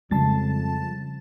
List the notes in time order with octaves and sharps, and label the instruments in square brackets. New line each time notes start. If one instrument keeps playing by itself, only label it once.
[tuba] F2 [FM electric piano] C#3 A5 A6 [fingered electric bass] G3 G#3